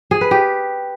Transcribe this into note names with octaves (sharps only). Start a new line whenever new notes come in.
G#4
B4
G4